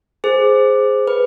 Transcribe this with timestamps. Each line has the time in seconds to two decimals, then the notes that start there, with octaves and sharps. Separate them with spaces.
0.24 G#4 C5
1.07 B4